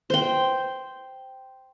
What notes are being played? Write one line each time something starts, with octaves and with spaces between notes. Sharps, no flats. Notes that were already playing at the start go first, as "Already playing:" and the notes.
C5 G5